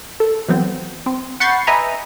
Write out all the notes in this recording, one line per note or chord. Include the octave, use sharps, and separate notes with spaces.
A4
E3 F#3 B3 C4
C4
F#5 B5 C#6 G6 A6 C7
B4 D#5 E5 G#5 A#5